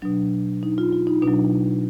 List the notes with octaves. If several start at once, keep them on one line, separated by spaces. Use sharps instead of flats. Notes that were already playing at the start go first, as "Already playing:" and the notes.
B2 F#3 D4
D#4
F4
F4
D#4
B2 D4
F#3